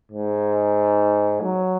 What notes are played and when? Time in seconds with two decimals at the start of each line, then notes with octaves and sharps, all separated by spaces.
0.12 G#2
1.42 F#3